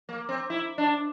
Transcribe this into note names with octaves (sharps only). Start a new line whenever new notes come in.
A#3
C4
E4
D4